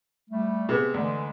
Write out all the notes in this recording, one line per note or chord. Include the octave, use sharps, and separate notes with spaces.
G3 A3
C3 G#3 B3
D2 D3 E3 G#3